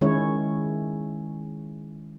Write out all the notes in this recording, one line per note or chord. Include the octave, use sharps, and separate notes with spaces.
D#3 G#3 C#4 E4 C#5